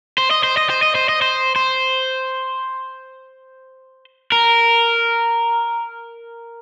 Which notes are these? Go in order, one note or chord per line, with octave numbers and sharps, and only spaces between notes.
C5
D#5
C5
D#5
C5
D#5
C5
D#5
C5
C5
A#4